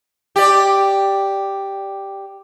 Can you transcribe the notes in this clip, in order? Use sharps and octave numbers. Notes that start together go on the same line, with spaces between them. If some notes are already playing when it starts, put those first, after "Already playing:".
G4 D5